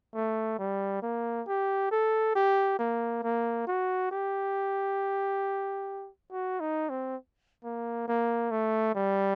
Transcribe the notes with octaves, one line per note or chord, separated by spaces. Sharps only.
A3
G3
A#3
G4
A4
G4
A#3
A#3
F#4
G4
F#4
D#4
C4
A#3
A#3
A3
G3